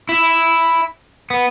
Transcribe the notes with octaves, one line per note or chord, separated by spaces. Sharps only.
E4
B3